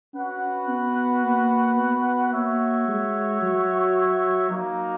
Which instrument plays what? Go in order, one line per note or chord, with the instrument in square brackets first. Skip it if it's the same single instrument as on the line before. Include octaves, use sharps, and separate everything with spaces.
[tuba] C#4 [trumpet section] F#4 B4 F#5
[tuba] B3
A#3
B3
[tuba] A#3 [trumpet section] F#4 C#5 E5
[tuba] G#3
F#3
[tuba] F#3 [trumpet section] A#3 D#4 A#4